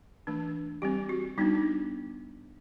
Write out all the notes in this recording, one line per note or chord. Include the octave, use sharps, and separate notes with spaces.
E3 A3 D4
G3 C4 G4
F#4
G3 B3 D4 D#4
D#4